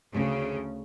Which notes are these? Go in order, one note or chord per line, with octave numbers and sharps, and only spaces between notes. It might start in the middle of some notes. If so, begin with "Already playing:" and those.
D2 C#3